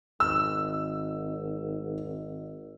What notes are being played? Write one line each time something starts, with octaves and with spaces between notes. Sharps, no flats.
G#1 E6